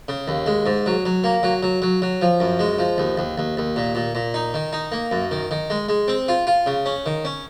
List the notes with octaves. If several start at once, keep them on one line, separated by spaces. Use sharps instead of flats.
C#3
D#2
G#3
G#2
F#3
F#3
A#3
F#3
F#3
F#3
F#3
F3
F#2
G#3
F3
D#2
D#2
D#2
D#2
A#2
A#2
A#2
D#4
D#3
D#4
A#3
F#2
D#3
D#3
G#3
G#3
C4
F4
F4
C#3
C#4
D#3
C#4